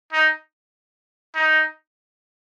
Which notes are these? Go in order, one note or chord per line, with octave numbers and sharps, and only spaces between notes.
D#4
D#4